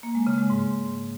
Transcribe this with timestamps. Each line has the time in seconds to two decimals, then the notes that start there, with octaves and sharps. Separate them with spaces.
0.03 A#3
0.15 G#3
0.27 C#3
0.38 G#3
0.50 G#2